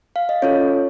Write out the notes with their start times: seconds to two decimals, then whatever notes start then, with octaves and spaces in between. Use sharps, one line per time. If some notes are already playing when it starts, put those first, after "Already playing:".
0.16 F5
0.29 D#5
0.42 C#4 F4 A4 C#5